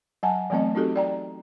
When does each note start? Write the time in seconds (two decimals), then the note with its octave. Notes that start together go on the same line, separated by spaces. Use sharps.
0.23 F#3 F#5 G#5 A5
0.50 E3 F#3 A3 B3 C4 D#5
0.75 C4 D#4 F#4 G4 A4
0.96 D5 G5 A#5